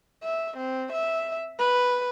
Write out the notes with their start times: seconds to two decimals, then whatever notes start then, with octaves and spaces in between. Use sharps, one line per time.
0.23 E5
0.57 C4
0.93 E5
1.59 B4